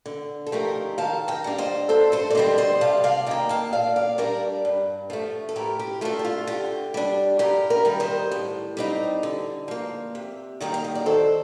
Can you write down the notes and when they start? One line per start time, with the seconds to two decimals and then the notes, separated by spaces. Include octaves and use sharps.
0.06 D3
0.47 A4
0.52 F3 A3 D#4 G4 A#4
0.98 D#3 F5 A5
1.28 D#5 G5
1.44 G3 D4 F5
1.58 C5 D#5
1.89 G2 A4 C5
2.12 A4 C5
2.30 D5
2.35 D3 G3 C4 C5 D#5
2.58 C5 D#5
2.81 C3 F5 A5
3.04 D5 F5
3.26 D#3 A#3 D#5 G5
3.49 F5 A5
3.73 A#2 D5 F5
3.96 D5 F5
4.18 G3 D4 A#4 D5
4.65 G2
5.10 F3 A3
5.49 A4
5.56 A2 G4 A#4
5.79 G4
6.01 A3 D4 F4 A4
6.19 G4
6.25 F4
6.47 D3 G4
6.94 G3 D4
7.39 G2 G4 A#4
7.70 A#4 D5
7.85 D#3 G3
8.00 C5 D#5
8.31 A2
8.77 G3 C4 D#4
9.23 D3
9.68 F3 A#3
10.15 C3
10.60 D#3 G3 A#3 D#4 G5
10.74 F5
10.84 D#5
10.95 D5
11.06 D#3 A4 C5